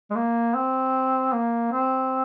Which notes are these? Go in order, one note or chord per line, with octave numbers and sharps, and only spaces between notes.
G#3
A#3
C4
A#3
C4